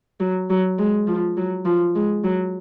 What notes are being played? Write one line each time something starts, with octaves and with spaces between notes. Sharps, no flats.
F#3
F#3
G#3
F3
F#3
F3
G#3
F#3